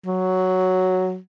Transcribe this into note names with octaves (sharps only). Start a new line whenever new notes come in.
F#3